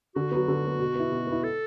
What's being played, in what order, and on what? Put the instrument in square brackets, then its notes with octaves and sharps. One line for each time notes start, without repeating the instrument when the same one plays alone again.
[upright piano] D3 [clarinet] F#4
[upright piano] F#3 B3
D3
F#3 B3
B2
B3 E4
B2
B3 E4
[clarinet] A4